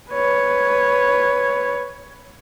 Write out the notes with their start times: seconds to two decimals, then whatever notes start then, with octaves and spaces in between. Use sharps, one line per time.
0.11 B4 C#5